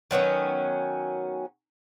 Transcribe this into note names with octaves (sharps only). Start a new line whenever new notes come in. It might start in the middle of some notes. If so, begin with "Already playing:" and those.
D#3 F#3 B3 C#4